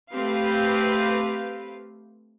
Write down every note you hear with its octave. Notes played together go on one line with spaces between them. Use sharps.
A3 C4 G4 B4 F5